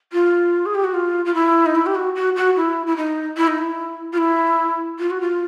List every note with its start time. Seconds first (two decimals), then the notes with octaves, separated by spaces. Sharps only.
0.13 F4
0.66 G#4
0.75 G4
0.84 F#4
0.94 F4
1.25 F4
1.34 E4
1.66 D#4
1.75 E4
1.86 G4
1.95 F#4
2.15 F#4
2.36 F#4
2.56 E4
2.87 E4
2.96 D#4
3.37 E4
3.48 D#4
3.58 E4
4.13 F4
4.18 E4
4.99 F4
5.11 F#4
5.21 F4